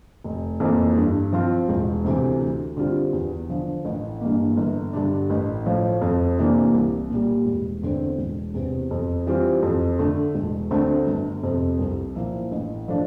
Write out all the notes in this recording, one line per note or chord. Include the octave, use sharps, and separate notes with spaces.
F1
F2 E3 A#3
G2
F3 C4 F4
E1
D2 C3 E3
D2
D3 G3 C4 F4
E2
D3 F3
A1
G2 E3 A#3
G1
G2 D3 G3 D4
A1
A2 F3
F2
C3 E3 A#3 D4
C2
A#2 G3
E1
E2 D3 A3 C4
E1
E2 C3
F2
E3 G3 C4 F4
F2
D3 A3
E1
D2 D3 A3 C4
G1
F2 C3
C2
A#2 F3 A#3 E4
A1
F3 A3 D4